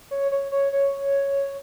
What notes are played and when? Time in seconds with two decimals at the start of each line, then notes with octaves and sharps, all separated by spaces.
0.11 C#5
0.32 C#5
0.52 C#5
0.73 C#5